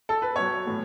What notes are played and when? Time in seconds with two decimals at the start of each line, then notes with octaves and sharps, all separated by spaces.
0.09 A4
0.22 B4
0.36 B2 F#3 C#5
0.67 A2 E3